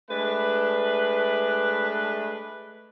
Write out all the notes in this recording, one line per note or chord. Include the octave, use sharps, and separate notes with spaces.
G#3 A3 D4 B4